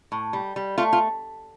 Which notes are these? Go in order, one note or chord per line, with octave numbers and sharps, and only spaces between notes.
A2
G3
G3
A3 F4
F4